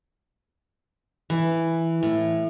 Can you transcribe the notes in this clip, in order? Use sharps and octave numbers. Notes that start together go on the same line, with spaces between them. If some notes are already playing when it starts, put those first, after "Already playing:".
E3
A2